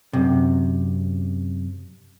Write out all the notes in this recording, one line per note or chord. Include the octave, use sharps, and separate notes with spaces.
F#2 C3